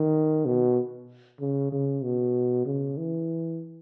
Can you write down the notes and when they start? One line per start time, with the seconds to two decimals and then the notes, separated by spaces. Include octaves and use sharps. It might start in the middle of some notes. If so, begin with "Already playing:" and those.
Already playing: D#3
0.46 B2
1.40 C#3
1.72 C#3
2.03 B2
2.66 C#3
2.97 E3